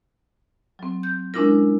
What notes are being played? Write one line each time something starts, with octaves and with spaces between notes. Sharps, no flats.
F#3 C4
G6
G#3 C#4 D4 E4 F4 A#4